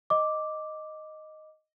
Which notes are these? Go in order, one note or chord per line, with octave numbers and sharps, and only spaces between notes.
D#5 D6